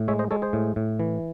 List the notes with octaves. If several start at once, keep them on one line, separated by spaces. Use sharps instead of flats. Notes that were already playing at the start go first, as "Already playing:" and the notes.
Already playing: A2
G#3 C#5 E5
C5 D#5
G#3 A4 C#5
G#4 C5
A2
A2
E3